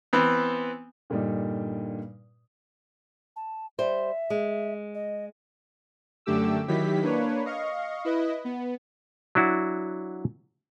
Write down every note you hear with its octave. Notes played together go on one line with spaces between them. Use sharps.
E3 B3 C4
G2 A#2 D3 G3 D#4
A5
G3 C5 E5
G#3
D#5
F#2 D3 A3 G4 D6 E6
D#3 F#3 E4 G4 B6
A#3 D4 B4 C#5
D#5 F5 C#6
E4 B4 D#5
B3
F#3 D4 E4 F#4